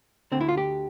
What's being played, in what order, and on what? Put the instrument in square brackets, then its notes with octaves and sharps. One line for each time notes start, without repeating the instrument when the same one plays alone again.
[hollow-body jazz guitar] D2 D3 C4
E4
F4
G4